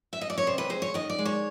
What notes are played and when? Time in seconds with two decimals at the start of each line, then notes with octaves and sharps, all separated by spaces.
0.13 E5
0.21 D#5
0.30 D5
0.38 C#5
0.47 C3 C5
0.58 B4
0.70 G#3 C5
0.82 C#5
0.94 D#3 D#5
1.10 D5
1.19 G#3
1.25 C#5